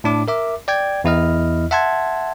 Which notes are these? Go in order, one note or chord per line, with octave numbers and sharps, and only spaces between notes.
A2 D4 D6
A#4 E5 D6
D5 G5 G#6
E2 E4 D#5 F6
E5 F#5 A5 C6 G#6